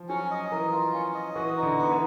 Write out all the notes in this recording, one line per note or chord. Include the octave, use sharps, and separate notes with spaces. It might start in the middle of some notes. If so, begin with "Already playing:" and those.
Already playing: F3
F#3 C#4
D#5
E3 A#4
F4
C#4
D#5
E3 F#4
D#4
D3
B3
E3